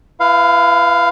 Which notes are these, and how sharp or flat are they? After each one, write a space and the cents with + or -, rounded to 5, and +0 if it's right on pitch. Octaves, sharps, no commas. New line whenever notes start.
E4 +35 B4 +0 F5 +0